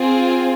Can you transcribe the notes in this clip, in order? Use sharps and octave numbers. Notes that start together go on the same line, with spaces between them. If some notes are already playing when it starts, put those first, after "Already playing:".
Already playing: C4 F4 G#4